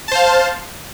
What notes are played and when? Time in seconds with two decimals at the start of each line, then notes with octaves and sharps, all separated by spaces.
0.08 A5
0.11 C5
0.15 F5